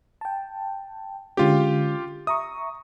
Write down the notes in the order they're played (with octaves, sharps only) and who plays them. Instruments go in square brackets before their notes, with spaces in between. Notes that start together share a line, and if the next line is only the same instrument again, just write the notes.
[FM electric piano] G5 A5
[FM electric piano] D3 G#3 C#4 [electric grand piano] F4 G4
[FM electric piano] E5 A#5 C#6 [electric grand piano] D#6